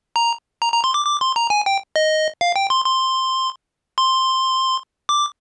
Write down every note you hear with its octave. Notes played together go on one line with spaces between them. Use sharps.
A#5
A#5
A#5
C6
D6
D6
C6
A#5
G#5
G5
D#5
F5
G5
C6
C6
C6
D6